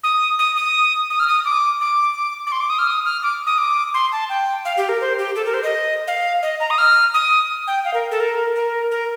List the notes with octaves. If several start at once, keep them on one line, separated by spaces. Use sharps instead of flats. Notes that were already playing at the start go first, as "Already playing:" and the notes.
D#6
D#6
D#6
D#6
F6
D#6
D6
D6
D6
C6
D6
D#6
F6
D#6
F6
D6
D#6
D6
C6
A5
G5
F5
G4
A#4
C5
G4
A4
A#4
C5
D#5
F5
D#5
A#5
D#6
F6
D#6
G5
F5
A#4
A4
A#4
A#4
A#4